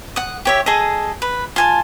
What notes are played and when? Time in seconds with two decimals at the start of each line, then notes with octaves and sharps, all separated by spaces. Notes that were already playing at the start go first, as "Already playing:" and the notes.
0.16 F#5 D#6
0.45 G4 C#5 E5
0.66 G#4 A4 D#5
1.22 B4
1.56 F4 G#5 A5